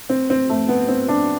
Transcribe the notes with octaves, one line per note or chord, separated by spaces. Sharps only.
C4
C4
A3
B3
C4
D4